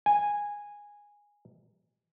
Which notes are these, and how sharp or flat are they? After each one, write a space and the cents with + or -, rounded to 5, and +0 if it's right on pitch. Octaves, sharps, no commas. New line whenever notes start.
G#5 -10